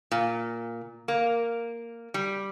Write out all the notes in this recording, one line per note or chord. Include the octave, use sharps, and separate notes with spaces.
A#2
A#3
G3